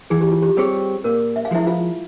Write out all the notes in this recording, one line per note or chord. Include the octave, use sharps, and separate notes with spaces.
E3 G#4
G4
F4
G4
G3 C4 G4 G#4 C#5
A#2 A#4
E5
F5
F3 G#3 E4 E5
F4 F5